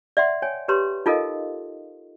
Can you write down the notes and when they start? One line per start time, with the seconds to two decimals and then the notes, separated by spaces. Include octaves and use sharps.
0.17 D5 E5 F#5 C6
0.42 C#5 G5 G#5
0.68 G4 B4 C#5 A#5 C6
1.06 D#4 F4 A4 A#4 D#5 F5